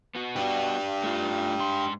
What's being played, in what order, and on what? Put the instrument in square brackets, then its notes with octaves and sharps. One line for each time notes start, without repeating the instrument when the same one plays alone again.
[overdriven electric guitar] B3 F#4
[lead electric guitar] D4 G4
[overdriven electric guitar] A3 F4
G#2 C6